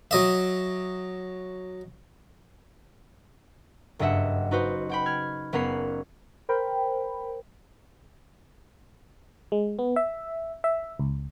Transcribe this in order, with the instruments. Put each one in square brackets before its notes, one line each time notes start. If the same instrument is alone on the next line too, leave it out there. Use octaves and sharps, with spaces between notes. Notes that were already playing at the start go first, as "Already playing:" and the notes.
[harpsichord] F#3 D#5 E5
[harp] F#1 G2 D#5 E5 F#5
D#4 F#4 B4 C5
F#4 G5 B5
F6 G#6
F#1 B3 C#4 A#4 B5 C7
[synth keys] A#4 C5 G5 B5
[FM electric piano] G#3
B3
E5
E5
C#2